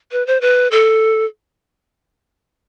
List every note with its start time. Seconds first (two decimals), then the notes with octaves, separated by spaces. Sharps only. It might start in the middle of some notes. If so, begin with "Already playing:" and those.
0.12 B4
0.27 C5
0.41 B4
0.71 A4